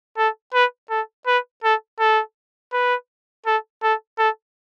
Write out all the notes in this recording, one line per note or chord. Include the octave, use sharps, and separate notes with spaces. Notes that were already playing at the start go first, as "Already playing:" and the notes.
A4
B4
A4
B4
A4
A4
B4
A4
A4
A4